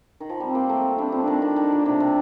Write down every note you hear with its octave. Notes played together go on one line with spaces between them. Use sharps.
D#3
F3
G3 C4
A#3
A3
G3 D4
F3 C4
D4
D#3
D#3
D#3
A#2
C3 D4
C3